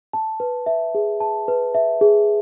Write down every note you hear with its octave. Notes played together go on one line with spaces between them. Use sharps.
A5
B4
E5
G#4
A5
B4
E5
G#4